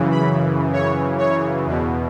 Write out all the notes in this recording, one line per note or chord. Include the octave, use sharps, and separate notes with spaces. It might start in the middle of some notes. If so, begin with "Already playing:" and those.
Already playing: F#2 C#3 E3
B5
C#5
C#5
E2 B2